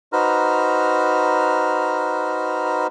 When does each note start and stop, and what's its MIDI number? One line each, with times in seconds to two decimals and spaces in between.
0.13 2.87 63
0.13 2.87 66
0.13 2.87 71
0.13 2.87 72
0.13 2.87 82
0.13 2.87 89